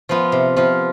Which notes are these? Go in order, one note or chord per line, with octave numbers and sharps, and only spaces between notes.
F3 B3 F4
C3
F3 B3 F4